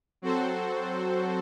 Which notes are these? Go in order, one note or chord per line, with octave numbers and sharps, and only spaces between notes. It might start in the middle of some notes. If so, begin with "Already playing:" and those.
F#3 C4 F#4 A4 C5